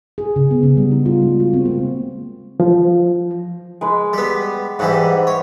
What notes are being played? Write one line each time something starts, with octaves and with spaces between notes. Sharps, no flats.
G#4
C#3
B3
C#3
G3
D#4
F4
G#3
F#4
C4
A#3
F3
G#3 B4
G3 B3
G#2 E3 G3 D#5 F#5 G#5
C#5